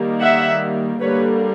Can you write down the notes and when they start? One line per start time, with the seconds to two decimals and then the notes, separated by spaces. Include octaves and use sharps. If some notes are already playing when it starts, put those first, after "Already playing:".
Already playing: D#3 G3 A#3
0.20 E5 F#5
1.01 D3 G3 A#3 B4 C#5